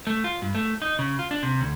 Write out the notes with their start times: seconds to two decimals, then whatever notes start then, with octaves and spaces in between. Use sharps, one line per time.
0.07 A3
0.24 F4
0.42 G2
0.55 A3
0.82 D#4
0.99 C#3
1.19 F4
1.31 D4
1.43 C3
1.61 D2